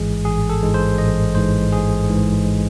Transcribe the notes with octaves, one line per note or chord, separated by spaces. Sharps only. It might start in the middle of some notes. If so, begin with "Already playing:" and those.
Already playing: A1 G#2 E3 G#3 G#4
A1 G#4
A4
G#2 E3 G#3
C5
A1 D#5
G#2 E3 G#3 C5
A1 G#4
G#2 E3 G#3